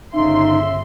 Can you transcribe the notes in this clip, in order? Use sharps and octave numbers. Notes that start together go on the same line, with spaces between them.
G1 C#3 D#4 E5 C6